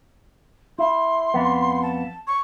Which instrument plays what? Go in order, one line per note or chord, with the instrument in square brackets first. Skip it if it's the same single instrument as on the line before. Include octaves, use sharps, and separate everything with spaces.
[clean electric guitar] E4 [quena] C6
[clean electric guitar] F2 B3
[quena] A5
C#6